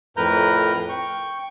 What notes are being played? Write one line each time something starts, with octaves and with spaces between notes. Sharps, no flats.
F2 A2 A#4 B4 A#5 G6
G5 C#6